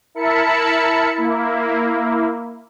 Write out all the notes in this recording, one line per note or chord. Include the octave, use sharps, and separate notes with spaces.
E4 A#4 E5 A5 B5 C#7
A#3 E4